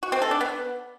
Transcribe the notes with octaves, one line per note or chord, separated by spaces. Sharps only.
F#4
C4
A4
D4
B3